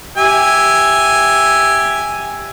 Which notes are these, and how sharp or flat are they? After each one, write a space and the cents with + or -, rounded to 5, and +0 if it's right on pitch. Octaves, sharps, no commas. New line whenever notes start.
G4 +0 E5 +0 G#5 +0